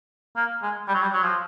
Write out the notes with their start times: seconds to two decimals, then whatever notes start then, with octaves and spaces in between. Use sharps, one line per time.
0.36 A#3
0.62 G#3
0.88 G3
0.94 F#3
1.02 G3
1.13 F#3
1.24 F3